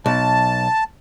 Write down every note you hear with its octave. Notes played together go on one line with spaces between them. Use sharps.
B1 A5